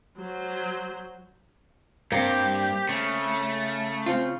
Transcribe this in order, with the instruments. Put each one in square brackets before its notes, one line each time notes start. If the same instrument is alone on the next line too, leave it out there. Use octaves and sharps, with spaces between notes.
[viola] F#3 C5
[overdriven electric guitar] G2 [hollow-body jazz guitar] A#3 C4 [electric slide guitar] G4
[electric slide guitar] C#3 [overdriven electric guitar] A3
[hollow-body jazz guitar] C4 F4